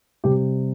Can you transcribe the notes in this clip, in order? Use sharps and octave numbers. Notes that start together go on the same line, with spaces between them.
C3 G3 G4